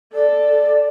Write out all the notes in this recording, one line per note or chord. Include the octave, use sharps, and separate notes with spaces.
A4 D5